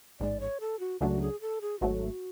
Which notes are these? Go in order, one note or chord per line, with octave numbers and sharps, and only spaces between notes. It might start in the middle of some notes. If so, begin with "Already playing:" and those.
A1 G#2 G#3 D5
C#5
A4
F#4
C#2 C#3 F#3 A3 D4 F#4
G#4
A4
G#4
G#1 G#2 F#3 A3 F#4